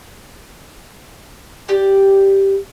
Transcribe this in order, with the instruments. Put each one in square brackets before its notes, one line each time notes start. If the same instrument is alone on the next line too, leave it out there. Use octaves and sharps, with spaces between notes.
[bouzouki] G4 D5 G5